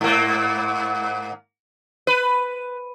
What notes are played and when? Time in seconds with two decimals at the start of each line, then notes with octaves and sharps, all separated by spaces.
0.01 G#2 A#3
2.07 B4